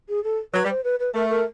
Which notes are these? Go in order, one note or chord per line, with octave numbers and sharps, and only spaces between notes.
G#4
A4
F#3 B4
G3
C5
B4
B4
A3 A#4
A#4